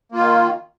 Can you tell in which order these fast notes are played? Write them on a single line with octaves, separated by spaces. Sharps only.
A#3 F4 D#3